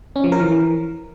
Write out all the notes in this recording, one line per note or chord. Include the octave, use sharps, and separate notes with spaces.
C#4
F3
A#4
E3